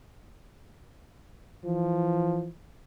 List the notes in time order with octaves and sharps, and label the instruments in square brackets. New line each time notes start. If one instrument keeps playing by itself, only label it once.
[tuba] E3 [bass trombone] F3